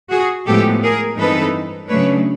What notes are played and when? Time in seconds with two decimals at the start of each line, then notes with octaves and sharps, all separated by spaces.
0.11 F#4 G#4
0.47 A2 F3 G#3 B3 G4 A4
0.83 G#4 A#4
1.17 G2 E3 G#3 C4 D#4 A4 B4
1.89 C#3 F#3 A3 D4 B4 C#5